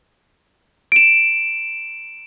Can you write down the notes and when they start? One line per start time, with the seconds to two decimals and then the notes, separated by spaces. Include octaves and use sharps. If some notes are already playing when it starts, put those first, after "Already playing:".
0.92 D7 E7